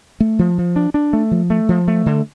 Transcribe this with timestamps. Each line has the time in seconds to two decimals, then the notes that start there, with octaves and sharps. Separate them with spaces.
0.20 A3
0.39 F3
0.58 F3
0.76 D4
0.94 D4
1.13 A3
1.31 F3
1.50 A3
1.69 F3
1.88 A3
2.06 D3